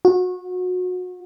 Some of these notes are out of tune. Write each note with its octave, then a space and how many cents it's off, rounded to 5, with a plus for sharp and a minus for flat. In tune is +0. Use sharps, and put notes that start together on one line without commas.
F#4 -30